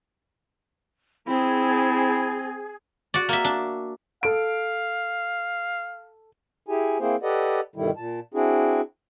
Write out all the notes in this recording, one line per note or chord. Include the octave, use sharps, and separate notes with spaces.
C4 E4 G#4
F#4 D5
A#3 E5
D4
A4 F5 D7
E4 G4 G#4 G#5
A#3 C4 E4 G#4 C5
G4 A4 B4 D5 D#5 F#5
G2 B2 D3 D#3 G3 E4
A#2 A5
C4 D4 E4 F#4 G#4